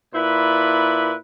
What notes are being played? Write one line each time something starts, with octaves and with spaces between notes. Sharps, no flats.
A#2 E4 B4